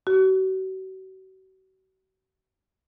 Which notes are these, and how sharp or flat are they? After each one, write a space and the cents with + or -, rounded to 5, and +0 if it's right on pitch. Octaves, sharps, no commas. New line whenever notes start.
F#4 +40